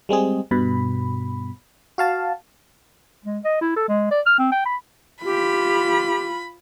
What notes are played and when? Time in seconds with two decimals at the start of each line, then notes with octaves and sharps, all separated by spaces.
0.09 G3 G#3 C4 G#4
0.51 G2 B2 B5
1.98 F#4 F5 A5
3.25 G#3
3.44 D#5
3.61 E4
3.76 A4
3.88 G#3
4.11 D5
4.26 F6
4.38 C4
4.52 G5
4.66 B5
5.25 F4 G4 B5